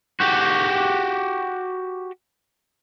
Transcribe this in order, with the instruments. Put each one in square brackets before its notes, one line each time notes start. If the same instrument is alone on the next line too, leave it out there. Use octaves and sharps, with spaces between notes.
[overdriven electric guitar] F#4 G4